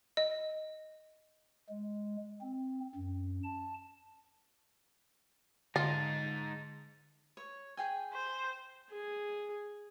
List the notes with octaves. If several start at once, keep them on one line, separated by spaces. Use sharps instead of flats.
D#5
G#3
C4
F#2
A5
D3 G#3 D#4 F4 A5 C6 A6
C#5
G#4 G5 G#5
C5
G#4